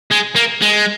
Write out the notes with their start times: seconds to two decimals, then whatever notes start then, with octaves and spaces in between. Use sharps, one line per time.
0.11 G#3
0.36 A#3
0.62 G#3